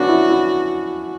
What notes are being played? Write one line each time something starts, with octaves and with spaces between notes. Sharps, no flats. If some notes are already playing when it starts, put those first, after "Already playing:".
Already playing: B3 C#4 D4 F#4
E4
E4